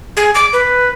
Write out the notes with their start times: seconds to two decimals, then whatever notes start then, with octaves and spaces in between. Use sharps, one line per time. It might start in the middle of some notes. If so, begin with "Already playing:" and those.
0.17 G#4
0.35 D6
0.53 B4